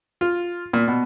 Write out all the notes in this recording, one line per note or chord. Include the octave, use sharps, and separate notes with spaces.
F4
A#2
B2